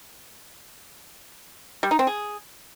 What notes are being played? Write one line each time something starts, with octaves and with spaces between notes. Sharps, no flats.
G3
D#4
C4
G#4